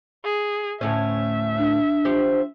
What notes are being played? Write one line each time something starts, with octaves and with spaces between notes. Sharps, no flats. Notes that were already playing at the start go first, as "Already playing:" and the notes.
G#4
D2 A2 C#4 E5
D4
F3 G4